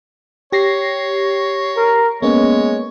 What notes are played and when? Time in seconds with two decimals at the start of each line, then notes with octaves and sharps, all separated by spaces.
0.52 G4 C#5 A#6 C7
1.76 A#4
2.22 G#3 A#3 B3 C#4 C#5